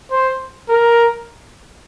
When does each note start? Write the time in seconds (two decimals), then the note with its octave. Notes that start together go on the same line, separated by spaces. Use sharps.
0.11 C5
0.69 A#4